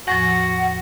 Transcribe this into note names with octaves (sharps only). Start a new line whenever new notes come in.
E2 A2 F3 F#4 F#5 A#6